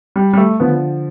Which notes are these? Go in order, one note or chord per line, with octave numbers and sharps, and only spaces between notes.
G3
G3
A3
D3 F3 B3